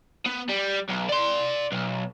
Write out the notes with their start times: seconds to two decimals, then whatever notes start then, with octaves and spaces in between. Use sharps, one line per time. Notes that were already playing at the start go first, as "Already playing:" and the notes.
0.26 B3
0.49 G3
0.89 B1
1.09 D5 C6
1.72 B1